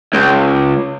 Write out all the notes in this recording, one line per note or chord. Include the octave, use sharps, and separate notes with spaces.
C#2